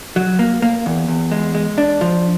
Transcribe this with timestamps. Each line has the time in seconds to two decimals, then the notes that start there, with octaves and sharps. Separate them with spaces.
0.16 F#3
0.39 A#3
0.62 A#3
0.86 E2
1.08 E2
1.31 G#3
1.55 G#3
1.78 D4
2.01 F3